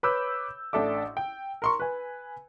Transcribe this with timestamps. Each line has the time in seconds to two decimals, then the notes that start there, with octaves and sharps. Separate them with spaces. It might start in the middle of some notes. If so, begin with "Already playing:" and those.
0.03 B4 C#5 B5 D6 E6 G6
0.73 A1 D4 A4 E5 D6
1.17 G5
1.62 A#4 C6 C#6
1.80 B4 G#5